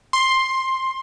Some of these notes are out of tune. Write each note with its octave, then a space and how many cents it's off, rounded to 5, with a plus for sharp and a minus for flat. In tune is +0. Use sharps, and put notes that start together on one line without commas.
C6 +10